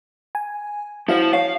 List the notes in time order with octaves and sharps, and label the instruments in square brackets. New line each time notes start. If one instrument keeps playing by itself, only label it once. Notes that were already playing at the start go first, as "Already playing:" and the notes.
[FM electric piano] G#5
[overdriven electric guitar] F3 C5 [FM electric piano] E4 F#4 F5
[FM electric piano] C#5 [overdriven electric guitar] F5